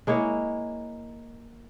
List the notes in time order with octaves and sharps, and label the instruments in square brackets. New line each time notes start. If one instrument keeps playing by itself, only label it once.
[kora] G#3 A#3 E4 C#5